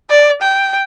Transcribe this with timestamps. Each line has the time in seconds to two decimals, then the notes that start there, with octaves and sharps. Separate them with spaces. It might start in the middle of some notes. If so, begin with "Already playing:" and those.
0.10 D5
0.42 G5